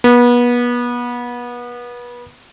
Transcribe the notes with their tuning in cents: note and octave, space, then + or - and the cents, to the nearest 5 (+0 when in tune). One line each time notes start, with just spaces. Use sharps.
B3 -30